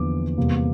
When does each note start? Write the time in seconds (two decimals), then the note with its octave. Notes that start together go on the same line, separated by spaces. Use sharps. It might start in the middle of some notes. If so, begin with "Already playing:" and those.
Already playing: E2 D3 F3 A#3 D6
0.37 E2 C3 G3 A#3